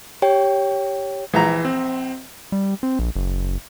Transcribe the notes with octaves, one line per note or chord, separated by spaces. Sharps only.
G4 C#5 G5
A#1 E3 A#5
C4
G3
C4
A#1
F#1